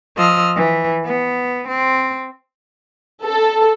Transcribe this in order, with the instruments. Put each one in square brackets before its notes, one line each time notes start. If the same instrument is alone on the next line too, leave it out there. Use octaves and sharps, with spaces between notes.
[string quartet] F3 D#5 E6 F6
E3
B3
C4
[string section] A4